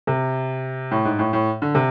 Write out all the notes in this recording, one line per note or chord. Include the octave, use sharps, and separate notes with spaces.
C3
A2
G#2
A2
A2
D3
C3